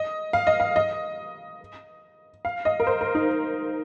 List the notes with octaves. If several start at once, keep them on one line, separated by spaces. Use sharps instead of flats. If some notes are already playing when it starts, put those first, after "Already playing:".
Already playing: D#5
F5
D#5
F5
D#5
F5
D#5
A#4
C5
A#4
D#4